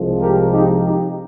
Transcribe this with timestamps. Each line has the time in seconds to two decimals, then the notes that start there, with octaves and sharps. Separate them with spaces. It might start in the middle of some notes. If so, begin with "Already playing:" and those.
Already playing: C2 C3 F3 G#3
0.20 G4 A#4
0.52 D#4 G4
0.84 D#4 G4